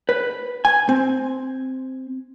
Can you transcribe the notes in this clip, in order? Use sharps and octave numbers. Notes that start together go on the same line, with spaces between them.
B4
G#5
C4